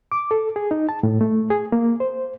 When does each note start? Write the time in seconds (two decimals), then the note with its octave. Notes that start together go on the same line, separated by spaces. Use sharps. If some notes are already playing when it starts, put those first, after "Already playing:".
0.12 D6
0.31 A4
0.56 G#4
0.71 D#4
0.89 A5
1.03 A2
1.21 A3
1.50 G#4
1.72 A#3
2.00 C5